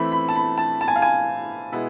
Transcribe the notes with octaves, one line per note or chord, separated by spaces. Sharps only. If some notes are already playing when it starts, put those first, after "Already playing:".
Already playing: E3 A3 C4 E4 B5
B5
A5
B5
A5
A5
G#5
F5
G#5
B2 G#3 B3 E4